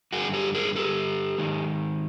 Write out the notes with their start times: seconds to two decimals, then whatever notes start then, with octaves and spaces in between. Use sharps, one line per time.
0.12 G2 D3 F#4 G#4
0.34 G4 A4
0.55 G#4 A#4
0.76 G4 A4
1.38 G#2 D#3